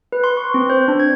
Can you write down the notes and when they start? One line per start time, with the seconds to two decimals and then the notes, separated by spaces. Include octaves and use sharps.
0.12 B4
0.24 C6
0.37 C#6
0.54 C4
0.70 C5
0.88 D4
1.00 G#6